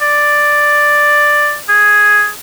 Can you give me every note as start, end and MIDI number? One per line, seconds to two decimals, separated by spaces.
0.01 1.57 74
1.69 2.28 68